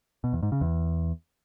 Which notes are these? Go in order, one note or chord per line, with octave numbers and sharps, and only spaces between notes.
B2
E2
G#2
C#3
E2